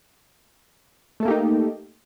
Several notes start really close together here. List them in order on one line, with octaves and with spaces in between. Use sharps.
A3 A4 A#3 G4 D#4